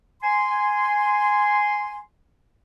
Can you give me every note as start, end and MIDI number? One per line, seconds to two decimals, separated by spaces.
0.23 2.00 80
0.23 2.00 84